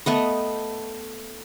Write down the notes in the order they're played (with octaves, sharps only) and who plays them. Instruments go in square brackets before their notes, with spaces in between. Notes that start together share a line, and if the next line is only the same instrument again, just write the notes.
[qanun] A3 B3 D#5